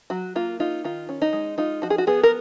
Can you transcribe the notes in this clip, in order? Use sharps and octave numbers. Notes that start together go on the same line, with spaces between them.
F#3 F#4
A#3 F4
D#4 F4
D#3 F4
C#4
D#4
G#3
D#4 F4
F3 F#4
G#4
F#4
B3 G#4
A#4